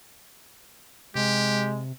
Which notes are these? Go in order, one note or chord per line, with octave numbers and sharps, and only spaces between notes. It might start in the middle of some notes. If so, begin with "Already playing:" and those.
C3 G#3 G4